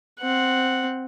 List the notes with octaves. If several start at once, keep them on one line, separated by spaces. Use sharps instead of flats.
C4 F#5